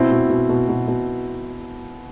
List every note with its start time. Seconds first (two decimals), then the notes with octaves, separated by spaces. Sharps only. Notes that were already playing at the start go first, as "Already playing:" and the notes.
Already playing: B2 C4 E4
0.11 B2
0.30 B2
0.49 B2
0.68 B2
0.87 B2